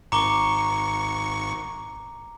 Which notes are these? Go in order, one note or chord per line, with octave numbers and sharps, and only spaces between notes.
G#1 A#5 C#6 D6 G7